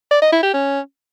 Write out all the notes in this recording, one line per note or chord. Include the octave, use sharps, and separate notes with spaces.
D5
D#5
E4
G4
C#4